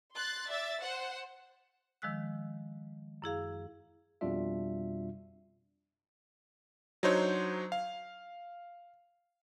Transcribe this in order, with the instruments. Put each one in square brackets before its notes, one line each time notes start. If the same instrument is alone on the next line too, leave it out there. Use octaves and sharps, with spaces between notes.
[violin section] C6 F#6 A6
D5 E5 A6
C5 F#5
[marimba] D#3 F3 G#3 E6 F#6
F#2 E4 G#4 F5
[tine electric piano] F2 B2 G3 D4 F4 E5
[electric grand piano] F#3 D4 D#4 C5 C#5
F5